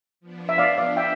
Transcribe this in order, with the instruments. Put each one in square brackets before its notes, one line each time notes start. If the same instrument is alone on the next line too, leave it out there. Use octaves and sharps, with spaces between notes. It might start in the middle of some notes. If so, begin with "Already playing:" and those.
[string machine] F3 B3 D4
[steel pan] E5
D5 F5
D5 F5
E5 G5